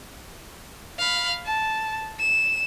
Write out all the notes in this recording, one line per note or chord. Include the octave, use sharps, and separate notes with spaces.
F5 B5
A5
E7